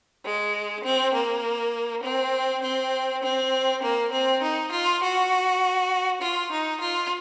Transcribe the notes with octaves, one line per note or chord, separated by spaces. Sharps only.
G#3
C4
A#3
C4
C4
C4
A#3
C4
D#4
F4
F#4
F4
D#4
F4